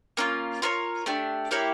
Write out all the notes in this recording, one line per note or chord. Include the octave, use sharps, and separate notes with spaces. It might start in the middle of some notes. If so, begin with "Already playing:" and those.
A#3 C#4 F4
F4 A#4 C#5
A3 D4 G4
A#3 E4 G4 C#5